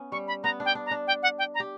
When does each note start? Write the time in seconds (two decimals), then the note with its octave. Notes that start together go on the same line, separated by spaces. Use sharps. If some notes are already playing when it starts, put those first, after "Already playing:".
Already playing: B3 C#4
0.12 G3 C#6
0.28 B5
0.44 B3 A#5
0.60 D4
0.65 G5
0.75 D4
0.86 A#5
0.91 D4
1.07 G5
1.23 F#5
1.39 G5
1.55 A#5
1.60 G4